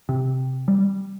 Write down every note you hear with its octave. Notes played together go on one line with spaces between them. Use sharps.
C3
G3